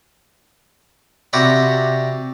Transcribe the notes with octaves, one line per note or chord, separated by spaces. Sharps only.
C3 F#4 G4 D5 A#5 B5